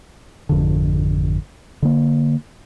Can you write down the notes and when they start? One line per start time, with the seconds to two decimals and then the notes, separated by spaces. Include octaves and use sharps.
0.49 G#1 F2 D3
1.82 D3 A#3